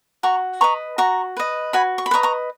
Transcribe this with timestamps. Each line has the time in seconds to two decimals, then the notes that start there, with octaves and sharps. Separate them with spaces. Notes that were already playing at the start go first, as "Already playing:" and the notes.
0.23 F#4 A#5 C#6
0.61 B4 D#5 A#5 C#6
0.98 F#4 A#5 C#6
1.37 B4 D#5
1.73 F#4 G#5 B5
1.98 C#6
2.06 B5
2.11 B4 D#5 A#5 C#6
2.23 A#5 C#6